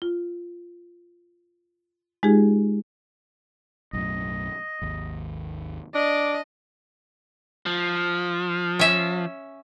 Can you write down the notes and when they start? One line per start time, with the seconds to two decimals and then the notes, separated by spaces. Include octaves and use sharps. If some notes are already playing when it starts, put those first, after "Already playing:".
0.02 F4
2.23 G#3 D#4 F4 G4 G#4
3.93 B1 F#2 A2 D#5
4.82 G#1 D#2
5.95 D4 D#5 D6
7.66 F3
8.79 C#4 E5